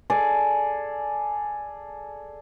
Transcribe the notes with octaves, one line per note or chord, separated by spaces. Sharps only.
G#4 A4 D5